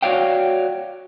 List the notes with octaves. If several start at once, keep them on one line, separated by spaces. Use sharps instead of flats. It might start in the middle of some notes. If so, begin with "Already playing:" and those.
F#4 C#5 D5 F5 G5